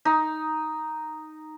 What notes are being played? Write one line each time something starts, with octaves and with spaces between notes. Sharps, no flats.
D#4